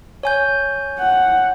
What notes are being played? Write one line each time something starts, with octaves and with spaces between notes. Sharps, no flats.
C#5 G#5 G6
F#5